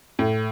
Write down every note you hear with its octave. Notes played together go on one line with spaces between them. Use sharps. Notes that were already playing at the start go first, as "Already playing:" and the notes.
A2